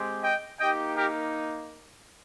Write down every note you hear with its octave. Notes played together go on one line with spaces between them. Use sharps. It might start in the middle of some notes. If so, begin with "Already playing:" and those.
Already playing: G#3 C4 G4
D#5 G5
A#3 D#4 G4 D#5 G5
G4 A#4